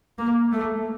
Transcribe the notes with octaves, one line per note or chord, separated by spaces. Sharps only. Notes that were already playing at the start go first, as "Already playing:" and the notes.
A#3
A3